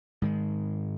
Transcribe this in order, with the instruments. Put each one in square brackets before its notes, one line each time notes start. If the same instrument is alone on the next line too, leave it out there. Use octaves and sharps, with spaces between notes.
[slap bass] G#2 D#3 G#3